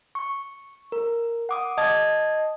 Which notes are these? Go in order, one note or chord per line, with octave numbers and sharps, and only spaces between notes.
C#6
A#4
F#5 D6 D#6
D#5 A5 D#6 G#6